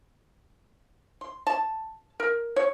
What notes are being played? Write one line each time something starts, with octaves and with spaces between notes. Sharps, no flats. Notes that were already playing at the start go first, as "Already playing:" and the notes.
C6
A5
A#4
C#5